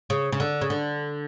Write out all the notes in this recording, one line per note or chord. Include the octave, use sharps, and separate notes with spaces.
C#3
C#3
D3
C#3
D3